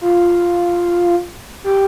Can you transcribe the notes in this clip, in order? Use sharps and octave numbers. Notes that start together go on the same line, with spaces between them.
F4
G4